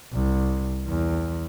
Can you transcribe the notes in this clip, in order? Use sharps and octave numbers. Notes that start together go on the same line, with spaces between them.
C2
E2